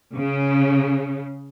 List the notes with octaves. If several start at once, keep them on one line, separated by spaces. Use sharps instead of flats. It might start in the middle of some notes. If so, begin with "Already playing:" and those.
C#3